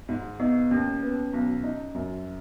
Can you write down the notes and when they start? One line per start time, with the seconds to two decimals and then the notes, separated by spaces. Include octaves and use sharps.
0.09 G#2
0.39 B3 D#4
0.71 D#2 C#4
1.02 B3
1.33 B1
1.63 D#4
1.94 F#2